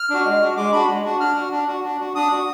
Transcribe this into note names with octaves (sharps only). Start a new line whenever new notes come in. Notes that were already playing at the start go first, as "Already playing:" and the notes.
Already playing: F6
D4 F#4
G#3
D4 F#4
G#3 D6
D4 F#4 B5
G#3
D4 F#4
D4 F6
F#4
D4
F#4
D4
F#4
D4 D#6
F#4